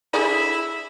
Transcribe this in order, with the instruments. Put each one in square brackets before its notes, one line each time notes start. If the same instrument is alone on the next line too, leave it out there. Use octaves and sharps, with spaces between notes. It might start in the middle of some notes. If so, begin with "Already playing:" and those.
[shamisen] D3 G#4 D5 [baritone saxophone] E4